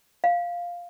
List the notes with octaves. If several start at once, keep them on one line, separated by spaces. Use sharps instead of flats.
F5